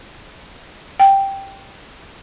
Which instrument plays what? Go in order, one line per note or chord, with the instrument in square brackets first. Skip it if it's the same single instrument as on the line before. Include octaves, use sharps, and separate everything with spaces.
[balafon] G5